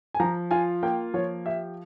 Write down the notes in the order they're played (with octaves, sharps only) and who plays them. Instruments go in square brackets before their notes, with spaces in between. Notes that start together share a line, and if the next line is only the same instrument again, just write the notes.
[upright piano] G#5
[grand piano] F3 [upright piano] A#5
[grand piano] F4 [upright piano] G#5
[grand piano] A#3 [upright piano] G5
[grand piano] F3 [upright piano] C#5
[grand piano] G4 [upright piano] E5